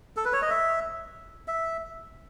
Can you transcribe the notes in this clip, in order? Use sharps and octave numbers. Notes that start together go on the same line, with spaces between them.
A4
B4
C#5
D#5
E5
E5